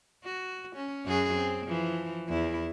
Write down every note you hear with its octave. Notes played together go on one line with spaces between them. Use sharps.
F#4
C#4
F#2 F#4 G#4
C4
E3 F3
E2 E4